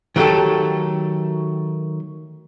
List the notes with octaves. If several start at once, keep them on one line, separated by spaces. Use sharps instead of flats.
D#3 F#3 A3 G4 A4